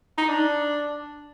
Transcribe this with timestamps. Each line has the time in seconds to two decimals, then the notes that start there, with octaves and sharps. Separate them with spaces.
0.18 D#4
0.29 D4